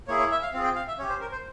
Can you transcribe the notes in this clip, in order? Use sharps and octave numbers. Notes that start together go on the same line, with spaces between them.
A#3 E4 G#4 C#5
C#5
E5
F5
C4 F4 G#4 F5
G5
F5
E5
C#4 G4 C#5
C5
A#4
C5